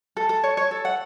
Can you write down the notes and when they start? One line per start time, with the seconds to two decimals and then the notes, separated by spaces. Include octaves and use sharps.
0.17 A4
0.29 A4
0.43 C#5
0.57 C#5
0.71 A4
0.85 F#5